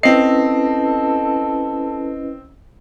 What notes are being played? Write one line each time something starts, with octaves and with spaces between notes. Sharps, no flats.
C4 C#4 E4 A4 B4 D#5 C7